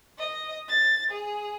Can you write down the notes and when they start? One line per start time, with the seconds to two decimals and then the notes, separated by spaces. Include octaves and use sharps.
0.18 D#5
0.69 A6
1.11 G#4